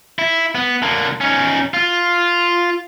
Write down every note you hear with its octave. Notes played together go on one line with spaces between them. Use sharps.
E4
B3
D3 A#3
C#4 D#4
F4